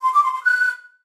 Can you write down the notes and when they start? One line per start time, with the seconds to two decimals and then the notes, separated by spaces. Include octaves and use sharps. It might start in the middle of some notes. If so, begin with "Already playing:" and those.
0.02 C6
0.13 D6
0.23 C6
0.33 C6
0.43 F#6